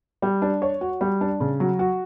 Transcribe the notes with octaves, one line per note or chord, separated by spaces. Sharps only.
G3
D4
C#5
F#4
G3
D4
C#3
F#3
F#4